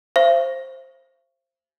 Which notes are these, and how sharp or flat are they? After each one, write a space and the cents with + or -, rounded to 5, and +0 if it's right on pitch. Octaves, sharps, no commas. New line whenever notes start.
C5 +10 F5 -45 C#6 +0